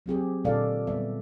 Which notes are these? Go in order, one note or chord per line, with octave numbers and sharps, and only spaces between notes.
F#3 C4 G4 G#4
A#2 D3 G#3 A4 D5 F5
G3 B3 E5